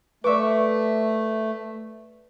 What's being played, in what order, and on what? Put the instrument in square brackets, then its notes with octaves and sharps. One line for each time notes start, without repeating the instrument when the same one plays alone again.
[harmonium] A3 [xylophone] B4 D5 [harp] E5 C#6 D6